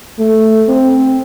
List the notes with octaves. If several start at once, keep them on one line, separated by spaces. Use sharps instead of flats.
A3
C4